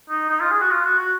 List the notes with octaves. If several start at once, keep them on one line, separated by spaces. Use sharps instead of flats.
D#4
D#4
F4
G#4
F#4
F4
F#4
F#4